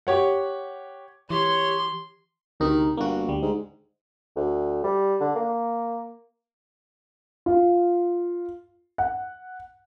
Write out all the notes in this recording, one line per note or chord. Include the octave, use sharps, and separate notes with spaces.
G4 C#5 F#5
E3 G4 C#5 C6
D2 C3 D#3 D#4
G1 A#3 F#4
D2 G3
G#2
D2
G3
D3
A#3
F4
F#5